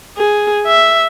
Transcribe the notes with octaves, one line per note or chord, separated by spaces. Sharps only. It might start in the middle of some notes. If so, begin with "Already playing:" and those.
G#4
E5